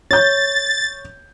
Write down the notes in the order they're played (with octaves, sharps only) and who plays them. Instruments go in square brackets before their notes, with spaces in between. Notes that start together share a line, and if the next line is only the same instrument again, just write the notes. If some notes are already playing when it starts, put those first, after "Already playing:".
[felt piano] C#5 G6 [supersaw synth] A6